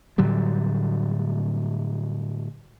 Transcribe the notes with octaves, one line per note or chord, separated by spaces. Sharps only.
A2 D3 F#3 G3